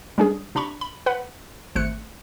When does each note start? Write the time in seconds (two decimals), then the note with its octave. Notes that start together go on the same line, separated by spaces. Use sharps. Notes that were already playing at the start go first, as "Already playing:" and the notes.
0.18 G3 G#3 C#4 D4 G#4
0.55 C3 D4 A#5 B5 C#6
0.81 B5
1.06 B4 F#5 B5
1.76 G#1 A3 C5 F#6 C#7